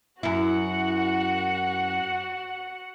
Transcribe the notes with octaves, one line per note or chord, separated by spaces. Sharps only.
F#2 E4 F#4 F#5